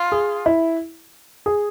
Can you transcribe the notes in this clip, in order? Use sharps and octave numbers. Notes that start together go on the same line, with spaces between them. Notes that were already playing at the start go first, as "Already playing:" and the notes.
Already playing: F4
G#4
E4
G#4